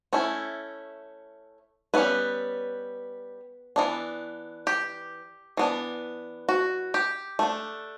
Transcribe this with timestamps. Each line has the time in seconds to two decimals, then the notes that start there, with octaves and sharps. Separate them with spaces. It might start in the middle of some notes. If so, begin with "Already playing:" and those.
0.13 A3 C#4 E4
1.94 G3 B3 C#4 E4 B4
3.76 E3 B3 D4
4.67 G4
5.57 E3 B3 D4
6.49 F#4
6.94 G4
7.39 A3 D4